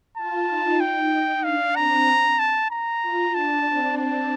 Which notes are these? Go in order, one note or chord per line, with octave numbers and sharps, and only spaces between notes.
F4 A5
D#4
G5
D#4
D4 F5
C4 A#5
A5
A#5
F4
D4 A5
C4
A5